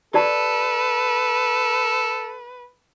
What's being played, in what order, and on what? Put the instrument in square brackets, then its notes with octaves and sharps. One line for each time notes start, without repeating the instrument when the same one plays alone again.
[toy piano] G4 D5 A5 [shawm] A4 [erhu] B4